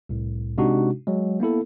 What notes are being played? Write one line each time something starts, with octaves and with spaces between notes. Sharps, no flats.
C2 A2
C3 G#3 D4 D#4 F#4
F#3 G#3
A#3 B3 E4 A4